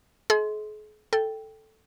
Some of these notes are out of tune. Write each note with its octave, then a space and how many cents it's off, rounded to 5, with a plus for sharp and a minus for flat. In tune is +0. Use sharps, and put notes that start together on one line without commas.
G#4 +45 D#5 +40 C6 +0
A4 +0 G5 +0